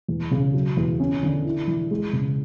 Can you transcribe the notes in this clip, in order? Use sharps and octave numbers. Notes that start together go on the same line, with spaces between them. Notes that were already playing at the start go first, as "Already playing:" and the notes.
E2
C#3
F#3
E2
C#4
D3
E4
E3
G#3
C#3